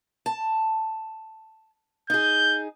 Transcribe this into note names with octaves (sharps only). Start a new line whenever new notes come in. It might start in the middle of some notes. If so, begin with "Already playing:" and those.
A5
D#4 G#4 G6